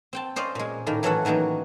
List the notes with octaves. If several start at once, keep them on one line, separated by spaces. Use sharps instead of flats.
C4 G5 A5
C#4 C5 D5 D#5 F5
A#2 G#3
A2 D#3 A#3
E3 F#3 C#4 A4 F#5
D#3 E3 F#3 A#3 D#4